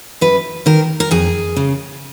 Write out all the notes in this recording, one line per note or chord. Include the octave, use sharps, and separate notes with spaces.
F#2 B4
D#3 A#4
A#4
F2 G#4
C#3